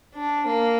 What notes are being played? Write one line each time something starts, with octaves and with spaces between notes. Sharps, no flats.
D4
A#3